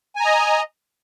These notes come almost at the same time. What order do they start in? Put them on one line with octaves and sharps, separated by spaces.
G#5 A#5 D#5